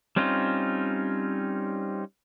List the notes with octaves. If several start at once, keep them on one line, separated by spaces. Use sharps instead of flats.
G3 C4 C#4 D#4 F4